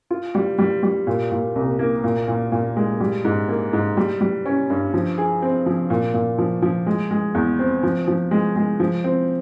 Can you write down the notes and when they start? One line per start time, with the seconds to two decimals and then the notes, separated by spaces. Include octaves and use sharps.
0.11 F4
0.35 G3
0.59 G3
0.83 G3
1.07 A#2
1.31 A#2
1.55 C2
1.79 A#3
2.04 A#2
2.28 A#2
2.52 A#2
2.77 G#3
3.00 G3
3.25 G#2
3.49 A#3
3.73 G#2
3.97 G3
4.21 G3
4.46 C#4
4.70 G2
4.94 F3
5.18 G#4
5.42 C4
5.66 F3
5.90 A#2
6.14 A#2
6.38 F3
6.62 F3
6.87 G#3
7.11 G#3
7.35 E2
7.59 C4
7.83 F3
8.08 F3
8.31 G#3
8.56 G#3
8.80 F3
9.04 C4